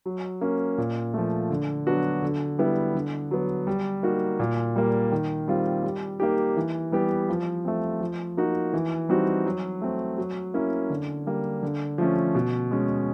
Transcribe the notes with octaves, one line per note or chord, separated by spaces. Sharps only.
F#3
A#3 C#4
A#2
F3 A3
D3
F#3 B3 D4 F#4
D3
G3 B3 E4
D3
F#3 B3
G3
A#3 D#4 F#4
A#2
G3 A#3
D#3
G3 C4 F4
G3
A#3 D#4 G4
E3
G3 B3 E4 G4
F3
A3 C4
F3
A#3 D#4 F#4
E3
G3 C4 D#4 F#4
F#3
A3 C4
F#3
A#3 C#4 E4
D3
G3 A#3
D3
F3 A3 C#4
B2
G#3 C#4